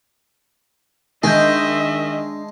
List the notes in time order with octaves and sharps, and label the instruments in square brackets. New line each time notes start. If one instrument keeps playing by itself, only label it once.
[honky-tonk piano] D#3 [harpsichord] G#3 [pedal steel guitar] D4 G6 [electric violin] D#5 E5